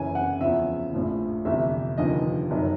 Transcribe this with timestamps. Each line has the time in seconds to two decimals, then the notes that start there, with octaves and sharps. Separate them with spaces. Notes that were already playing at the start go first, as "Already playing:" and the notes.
Already playing: F#1 F#2 C#3 E3 G#5
0.15 F#5
0.41 E2 C#3 F3 E5
0.93 A#1 A2 F3
1.45 G1 F2 C3 E3 E5
1.97 F1 D#2 D3 F3 D#5
2.50 F#1 F#2 D#3 F#3